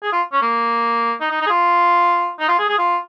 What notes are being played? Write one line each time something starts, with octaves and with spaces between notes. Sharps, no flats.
G#4
F4
C#4
A#3
D#4
D#4
D#4
G#4
F4
D#4
F4
G#4
G#4
F4